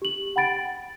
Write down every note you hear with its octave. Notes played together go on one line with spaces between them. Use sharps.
G4 F#7
F#5 G5 B5 A6 D7